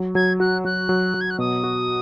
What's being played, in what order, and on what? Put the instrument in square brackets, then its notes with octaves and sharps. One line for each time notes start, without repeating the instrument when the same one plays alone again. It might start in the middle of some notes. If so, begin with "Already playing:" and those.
Already playing: [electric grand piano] F#3
[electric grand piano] F#3 [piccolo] G#6
[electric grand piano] F#4 [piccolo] F#6
[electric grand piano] F#3 [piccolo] F#6
[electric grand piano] F#3
F#3
[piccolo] G#6
F#6
[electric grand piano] B2 [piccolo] D#6
[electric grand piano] F#4